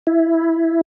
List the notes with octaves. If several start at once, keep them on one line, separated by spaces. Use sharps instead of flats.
E4